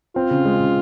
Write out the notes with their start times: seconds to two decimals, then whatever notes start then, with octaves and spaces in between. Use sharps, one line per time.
0.16 C4 F4
0.31 C#3
0.45 G#3
0.60 C#3